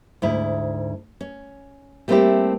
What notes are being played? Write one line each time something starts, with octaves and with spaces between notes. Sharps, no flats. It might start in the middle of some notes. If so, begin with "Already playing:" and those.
D2 G#2 E4
C#4
G3 A3 A#3 C4 E4 G4